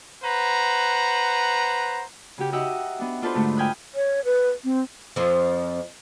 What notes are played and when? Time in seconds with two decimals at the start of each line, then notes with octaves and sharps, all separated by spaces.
0.23 B4 C5 F#5 A#5
2.38 C#3 F#4 G4
2.52 D#4 F#4 G4 D#5 E5 F#5
2.99 B3 D4
3.22 D4 F4 A4 B4 C5
3.35 G#2 D3 A3
3.57 F5 G5 G#5 B5 D#6 F#6
3.95 C#5
4.25 B4
4.64 C4
5.16 F2 F3